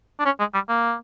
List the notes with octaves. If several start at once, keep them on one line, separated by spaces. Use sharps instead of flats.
D4
C#4
G#3
G3
A#3